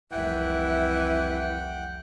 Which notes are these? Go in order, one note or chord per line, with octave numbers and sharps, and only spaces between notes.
F1 C2 E3 E5 F#5 G5